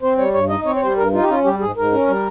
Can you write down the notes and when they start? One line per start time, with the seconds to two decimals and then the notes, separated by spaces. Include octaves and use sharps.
0.02 C4 C5
0.17 G3 C#5
0.34 G2 C#5
0.49 D#4 D#5
0.65 C4 C#5
0.76 C#5
0.81 G3 C5
0.97 G2 A#4
1.13 D#4 F4
1.22 G4
1.28 C#4 F4
1.44 G3 G4
1.60 G#2 G#4
1.76 G#2 A#4
1.92 C#4
2.08 G3